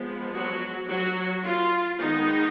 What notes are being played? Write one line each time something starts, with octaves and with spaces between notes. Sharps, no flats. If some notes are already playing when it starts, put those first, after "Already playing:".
Already playing: F3 G#3 B3
F#3 F#4
F#3 F#4
F4
D#3 G#3 B3 D#4